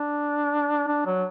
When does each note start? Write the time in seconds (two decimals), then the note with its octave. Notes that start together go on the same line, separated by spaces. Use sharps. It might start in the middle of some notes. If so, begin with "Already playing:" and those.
Already playing: D4
0.87 D4
1.06 F#3